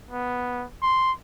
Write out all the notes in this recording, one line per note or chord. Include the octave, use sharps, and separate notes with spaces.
B3
C6